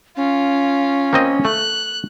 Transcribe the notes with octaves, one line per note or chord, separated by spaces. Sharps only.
C#4 F4
A#3 C4 D#5
A3 F#6